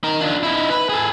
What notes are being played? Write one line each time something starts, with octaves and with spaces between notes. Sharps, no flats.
D#4 A#4
D4 F4
D#4 E4
B4
G#4 A4